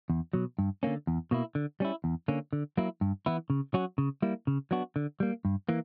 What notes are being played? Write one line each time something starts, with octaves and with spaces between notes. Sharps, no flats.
E2
B2 F#3
G2
D3 A#3 C#4
E2
B2 A#3 E4
D3
G3 C#4 E4
E2
D3 A#3 C#4
D3
F#3 A#3 E4
G2
E3 B3 E4
C#3
F#3 C#4 F#4
C#3
G3 A#3 E4
C#3
F#3 B3 D4 F#4
D3
G3 A#3
G2
E3 A#3